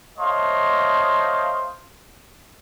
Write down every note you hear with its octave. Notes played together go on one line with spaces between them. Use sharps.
A3 C5 C#5 D#5 F5 C6